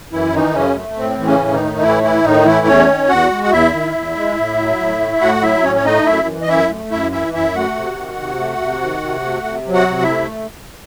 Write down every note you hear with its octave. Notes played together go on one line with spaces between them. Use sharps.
F#2 E3 E4
D#3 E3 D#4
F#2 C#3 C#4
A3
A2 C4
E3
C#3 C#4
A2
D#3 D#4
A3
A2 E3 E4
E3 E4
A2 D#3 D#4
E3 A3 E4
E2 C#4 C#5
D#3
E2 F#4 F#5
G#3
F#5
E2 E4 E5
D#3
E2
G#3
A2
F#3
A2
A3
A2 F#4 F#5
F#3 E4 E5
A2 C#4 C#5
C#5
A3 D#4 D#5
F#2 E4 E5
E3
D#5
F#2 E4 E5
A3
F#2 E4 E5
E3 E4 E5
F#2 E4 E5
A3 F#4 F#5
C3
D#3
C3
A3
C3
D#3
C3
A3
C3
F#3
F#4 F#5
C3
E4 E5
A3